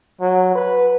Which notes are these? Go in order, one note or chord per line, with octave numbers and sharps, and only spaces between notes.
F#3
B4